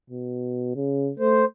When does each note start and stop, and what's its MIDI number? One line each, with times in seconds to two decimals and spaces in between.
0.10 0.75 47
0.76 1.11 49
1.20 1.44 57
1.20 1.45 72